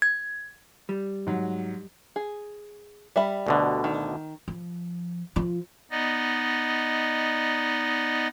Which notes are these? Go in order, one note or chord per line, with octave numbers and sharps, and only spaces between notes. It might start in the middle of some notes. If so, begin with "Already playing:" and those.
G#6
G3
G#2 F#3
G#4
G3 E5 B5
D2 B2 D3
D#3
F3
F3 F4
B3 D#4 D5 D#5